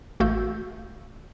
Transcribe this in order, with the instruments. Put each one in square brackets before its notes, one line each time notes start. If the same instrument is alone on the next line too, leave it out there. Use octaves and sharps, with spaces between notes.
[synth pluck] A1 A3 F#4 F5 E6 G6